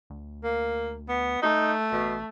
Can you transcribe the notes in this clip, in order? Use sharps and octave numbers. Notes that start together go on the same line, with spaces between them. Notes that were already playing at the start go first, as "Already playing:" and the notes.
D2
A#3
B3
A3 D#4
A1 B2